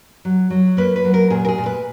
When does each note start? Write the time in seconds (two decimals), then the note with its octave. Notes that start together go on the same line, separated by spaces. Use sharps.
0.25 F#3
0.50 F#3
0.77 A#3 B4
0.96 B4
1.05 F#3
1.14 A#4
1.30 A#2 G#4
1.45 A#4
1.48 G#4
1.58 A#2
1.66 B4